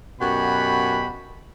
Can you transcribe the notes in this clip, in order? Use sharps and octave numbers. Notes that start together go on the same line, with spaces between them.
F#2 B2 F#4 G4 B4 B5